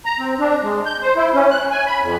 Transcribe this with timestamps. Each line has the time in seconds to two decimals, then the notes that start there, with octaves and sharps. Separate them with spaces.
0.05 A#5
0.19 C4
0.39 D4
0.63 G#3
0.86 G6
1.02 C5
1.16 E4
1.34 C#4
1.51 F#6
1.71 G#5
1.86 B5
2.02 F2